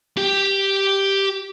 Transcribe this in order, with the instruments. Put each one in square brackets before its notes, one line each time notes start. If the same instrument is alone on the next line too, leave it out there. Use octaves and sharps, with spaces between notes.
[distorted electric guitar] G4 G5